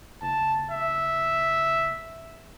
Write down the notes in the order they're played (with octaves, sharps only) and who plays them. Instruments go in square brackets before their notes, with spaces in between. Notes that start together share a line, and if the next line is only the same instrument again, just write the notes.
[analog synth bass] F#1 [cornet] A5
[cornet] E5